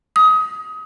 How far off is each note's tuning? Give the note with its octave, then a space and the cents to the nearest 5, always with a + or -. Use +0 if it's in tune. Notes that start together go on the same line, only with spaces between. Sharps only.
D#6 +20